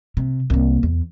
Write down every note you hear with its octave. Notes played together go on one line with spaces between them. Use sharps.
C3
C2 A#3
E2